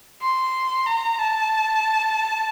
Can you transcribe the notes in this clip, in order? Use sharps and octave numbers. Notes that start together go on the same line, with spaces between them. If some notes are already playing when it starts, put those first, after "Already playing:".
C6
A#5
A5